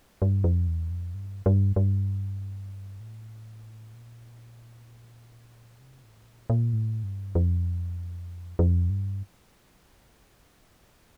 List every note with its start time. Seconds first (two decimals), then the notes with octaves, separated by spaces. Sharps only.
0.22 G2
0.44 F2
0.68 E2
0.91 F2
1.14 G2
1.46 G2
1.76 G2
3.00 A2
3.94 A#2
5.80 C3
6.03 A2
6.26 A#2
6.50 A#2
6.73 A2
7.04 G2
7.35 F2
8.59 F2
8.90 G2